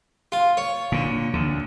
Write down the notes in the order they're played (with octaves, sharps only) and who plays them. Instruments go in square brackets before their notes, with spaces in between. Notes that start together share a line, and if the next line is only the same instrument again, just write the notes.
[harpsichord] F4
C#5
[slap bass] A#2 D3
D2 D3